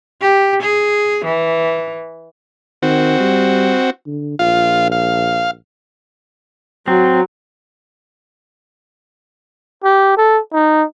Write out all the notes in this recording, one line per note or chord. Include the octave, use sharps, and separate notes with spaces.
G4
G#4
E3
D#3 C4 F#4
G3
D3
A#1 F4 F5
F5
F#3 C4
G4
A4
D#4